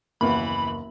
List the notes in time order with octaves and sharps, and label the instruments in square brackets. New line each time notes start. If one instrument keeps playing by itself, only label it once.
[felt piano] F#1 D#2 [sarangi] E3 [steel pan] A#3 B3 [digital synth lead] B5